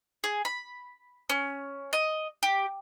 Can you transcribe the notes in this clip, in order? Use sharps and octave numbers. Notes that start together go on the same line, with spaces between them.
G#4
B5
C#4
D#5
G4